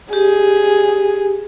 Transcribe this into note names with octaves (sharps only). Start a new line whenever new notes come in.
G4 G#4